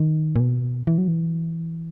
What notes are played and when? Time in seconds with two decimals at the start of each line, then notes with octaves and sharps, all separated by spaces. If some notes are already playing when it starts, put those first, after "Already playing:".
Already playing: D#3
0.36 A#2
0.40 B2
0.87 E3
0.98 F#3
1.08 E3